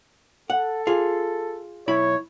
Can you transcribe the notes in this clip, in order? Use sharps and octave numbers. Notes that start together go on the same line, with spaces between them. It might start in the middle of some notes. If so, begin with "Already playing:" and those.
A4 F#5
F4 G#4
B1 E4 C#5 B5